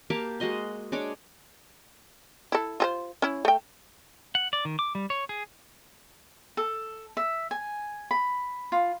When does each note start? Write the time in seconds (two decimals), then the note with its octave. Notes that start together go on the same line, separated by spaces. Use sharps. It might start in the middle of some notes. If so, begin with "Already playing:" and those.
0.10 A#3 G4 F5 A5
0.40 G#3 F#4 D#5 C6
0.92 G#3 D4 C#5 D6
2.52 E4 A4
2.80 F4 G#4 C5
3.22 C#4 E4
3.45 A3 G5
4.35 F#5
4.53 D5
4.65 D#3
4.79 D6
4.95 G3
5.10 C#5
5.29 G#4
6.57 A4
7.17 E5
7.51 G#5
8.11 B5
8.72 F4